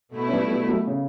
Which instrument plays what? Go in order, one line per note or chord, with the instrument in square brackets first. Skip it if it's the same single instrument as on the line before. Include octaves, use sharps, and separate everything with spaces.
[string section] B2 A3 E4
[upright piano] C#4
G3 B3
G3 B3
F#3 A3
C#3